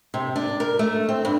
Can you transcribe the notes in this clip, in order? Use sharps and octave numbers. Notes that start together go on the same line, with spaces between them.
C3
D4
A#4
A3
C4
G2